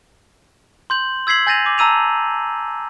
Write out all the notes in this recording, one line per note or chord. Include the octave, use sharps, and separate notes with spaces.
C6 G6 F#7
E6 G#6 B6 C7 F#7
G#5 G6 A6 A#6 D#7 F7
D6
A5 A#5 E6 D#7 F7